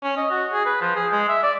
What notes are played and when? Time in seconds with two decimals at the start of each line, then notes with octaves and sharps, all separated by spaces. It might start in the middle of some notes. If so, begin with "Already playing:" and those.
0.03 C#4
0.17 D#5
0.31 F#4
0.52 G#4
0.66 B4
0.81 F3
0.96 G#4
1.12 G#3
1.29 E5
1.43 D5